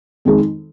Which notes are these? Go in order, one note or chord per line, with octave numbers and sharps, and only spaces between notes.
F2 D#3 G#3